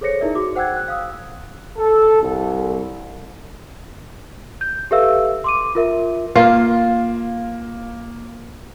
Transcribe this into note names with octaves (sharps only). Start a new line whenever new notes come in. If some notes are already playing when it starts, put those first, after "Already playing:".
G#4 A4 C5 C#5 A#6 C#7
D#4 E4 G#4 A#4 D5 E5
F#4 G#4 D6
C5 F#5 G5 E6 F#6 G#6
F#6
F5 D#6 E6
A4
C2
G6
G4 A4 B4 E5 F5 E6
C6 D6 D#7
F4 A#4 E5
A#3 F4